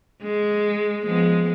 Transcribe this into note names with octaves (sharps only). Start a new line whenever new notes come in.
G#3
F3 G#3 B3